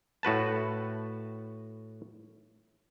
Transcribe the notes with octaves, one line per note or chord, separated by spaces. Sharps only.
A2 F#4 B4 A5